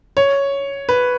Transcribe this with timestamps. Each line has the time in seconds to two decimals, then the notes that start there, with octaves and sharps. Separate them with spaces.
0.17 C#5
0.89 B4